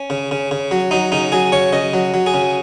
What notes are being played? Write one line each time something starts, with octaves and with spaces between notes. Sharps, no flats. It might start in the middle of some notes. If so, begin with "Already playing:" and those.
Already playing: C#4
C#3
C#3
C#3
F#3
F#3 D#4
C#3 D#4
F#3 G#4
C#3 C#5
C#3 D#5
F#3
F#3
G#4
C#3